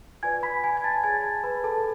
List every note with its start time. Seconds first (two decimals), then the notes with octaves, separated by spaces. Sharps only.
0.23 F4 B4 D5 G#5 G#6
0.43 B5 B6
0.64 G#5 G#6
0.77 G#6
0.84 A5 A6
1.04 G#4 C#5 G#5 G#6
1.23 A5 A6
1.44 B4 B5
1.64 A4 A5